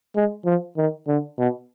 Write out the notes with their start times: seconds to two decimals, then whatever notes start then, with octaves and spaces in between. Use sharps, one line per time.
0.15 G#3
0.45 F3
0.77 D#3
1.07 D3
1.38 B2